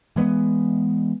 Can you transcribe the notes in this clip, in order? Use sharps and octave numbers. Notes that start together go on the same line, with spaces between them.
E3 G#3 B3